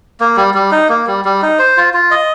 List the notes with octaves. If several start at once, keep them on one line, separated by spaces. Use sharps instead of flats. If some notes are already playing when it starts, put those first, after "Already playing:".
A#3
G3
G3
D#4
A#3
G3
G3
D#4
C5
F4
F4
D#5